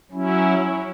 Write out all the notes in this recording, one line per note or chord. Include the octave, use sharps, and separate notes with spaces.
F#3 C#4 E4